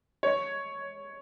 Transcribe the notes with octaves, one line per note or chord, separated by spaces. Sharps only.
C#5